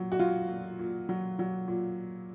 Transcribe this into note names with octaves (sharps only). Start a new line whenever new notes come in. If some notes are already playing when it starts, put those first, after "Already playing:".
Already playing: A#2 F#3
F#4
F#3 F4
A#2
A#2
F#3
F#3
A#2